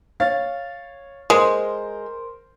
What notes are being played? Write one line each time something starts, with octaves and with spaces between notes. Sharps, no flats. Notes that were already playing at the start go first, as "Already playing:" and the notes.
C#5 F5 A6
G#3 A#4 C5 C6